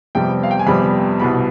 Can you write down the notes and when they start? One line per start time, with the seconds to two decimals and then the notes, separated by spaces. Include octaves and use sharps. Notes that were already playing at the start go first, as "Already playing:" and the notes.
0.15 F2 C3 G3 B3 G5
0.43 F5
0.51 G5
0.59 G#5
0.67 F2 C3 G3 B3 B5
1.19 C2 B2 B3 B5